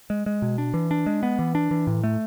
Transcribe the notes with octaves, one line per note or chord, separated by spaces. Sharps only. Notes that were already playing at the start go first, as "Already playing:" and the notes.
G#3
G#3
B2
D4
E3
D4
G#3
B3
E3
D4
E3
A2
A3